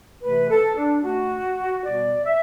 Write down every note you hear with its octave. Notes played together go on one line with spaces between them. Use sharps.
C3 E3 A3 B4
A4
D4
B2 A3 F#4
B2 G3 B3 D5
E5